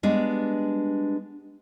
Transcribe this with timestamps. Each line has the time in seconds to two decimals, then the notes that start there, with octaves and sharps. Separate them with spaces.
0.03 G3 G#3 B3 D4